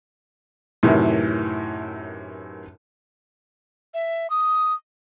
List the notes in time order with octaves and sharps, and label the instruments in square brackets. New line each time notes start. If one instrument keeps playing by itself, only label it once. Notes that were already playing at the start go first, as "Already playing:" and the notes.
[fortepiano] F#2 A2 C3 D#3 E3
[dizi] E5
D#6